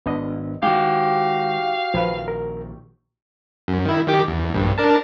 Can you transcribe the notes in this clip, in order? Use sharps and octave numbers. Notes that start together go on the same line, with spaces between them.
G#1 B3 D4 D#5
D#3 G#3 D#4 F#4 G4 F5
A#1 D#3 F3 B4
A#4
F#2
D#3 E4
D#3 G4 D6
E2
A#1 G2
D4 A#4 A5